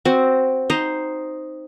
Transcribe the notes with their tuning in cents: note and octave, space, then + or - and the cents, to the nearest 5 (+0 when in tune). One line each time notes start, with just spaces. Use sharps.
C4 +0 F#4 +0
D#4 +0 C5 +0